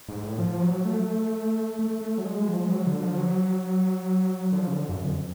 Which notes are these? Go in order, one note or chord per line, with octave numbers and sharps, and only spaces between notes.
G#2
A2
F3
F#3
A3
A3
A3
F#3
G#3
F3
G#3
F#3
D3
F3
F#3
D3
F3
C#3
D3
F#2
F2